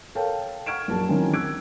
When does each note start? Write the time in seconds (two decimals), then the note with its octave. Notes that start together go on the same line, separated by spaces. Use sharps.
0.15 A4 A#4 C#5 F5 G5 A5
0.66 F#5 C#6 F6 G#6 D7 E7
0.88 A#1 F#2 A#4 A5
1.08 D#3 E3 F#3 A#3 C4 C#4
1.33 E6 F#6 G#6 D7